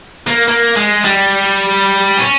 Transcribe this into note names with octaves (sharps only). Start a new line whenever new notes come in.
A#3
A#3
G#3
G3
C#4